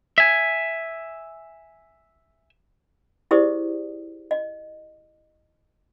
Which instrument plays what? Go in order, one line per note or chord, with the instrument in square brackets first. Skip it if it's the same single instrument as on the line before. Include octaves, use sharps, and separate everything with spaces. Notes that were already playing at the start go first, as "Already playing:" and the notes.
[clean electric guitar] E5 G#5
[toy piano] E4 G4 G#4 C5 D5 D#6
D#5